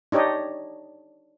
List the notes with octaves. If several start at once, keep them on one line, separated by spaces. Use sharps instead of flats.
D4 D#4 G4 C#5 D#5